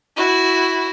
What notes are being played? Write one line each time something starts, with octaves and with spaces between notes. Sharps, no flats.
E4 F#4